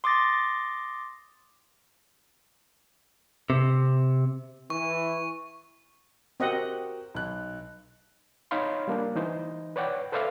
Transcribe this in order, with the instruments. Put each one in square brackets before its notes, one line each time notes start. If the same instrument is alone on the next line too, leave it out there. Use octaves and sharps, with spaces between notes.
[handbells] C6 D6 D#6 A6 A#6
[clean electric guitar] C3
[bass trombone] E3 [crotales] C#6
[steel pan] C4 D#5 F#5 [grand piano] F#4 G4 A#4
[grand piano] B1 F#6
[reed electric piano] D#4 C#5 F5 B5 C6
G3 A#3 D4
E3 D#4 C5
B4 C#5 D5 F#5 G5
A4 B4 C5 D5 E5 F5